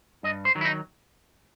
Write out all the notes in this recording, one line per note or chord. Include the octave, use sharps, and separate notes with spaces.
G2 D#5
C5
D#3 F#3
E4
D#4